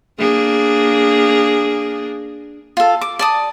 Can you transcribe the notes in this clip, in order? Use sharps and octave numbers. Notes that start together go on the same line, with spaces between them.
A#3 D4 G#4
F4 A4
D6
D5 A5 D#6